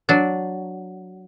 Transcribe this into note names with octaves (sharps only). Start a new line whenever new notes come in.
F#3 D4